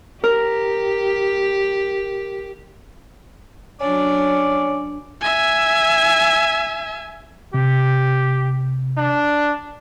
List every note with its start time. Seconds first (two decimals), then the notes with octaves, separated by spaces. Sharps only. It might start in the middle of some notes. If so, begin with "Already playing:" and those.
0.24 G4 A#4
3.80 F#3 C#4 D4 D5
5.21 E5 G#5
7.54 C3 G4
8.98 D4